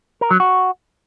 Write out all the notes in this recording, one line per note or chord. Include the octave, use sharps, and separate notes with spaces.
A#4
F#3
F#4